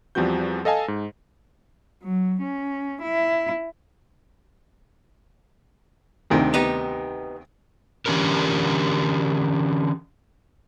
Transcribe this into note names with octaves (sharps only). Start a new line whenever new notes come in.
E2 F3 G3 C4 F#4 G6
A4 D#5 F5 G#5 A5
G#2
F#3
C#4
E4
D2 C3 D#3
B3 D#4 G4
D3 E3 C#4 G4 A#4